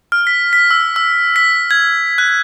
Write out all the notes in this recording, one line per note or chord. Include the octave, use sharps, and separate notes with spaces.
F6
B6
B6
E6
E6
B6
G#6
F#6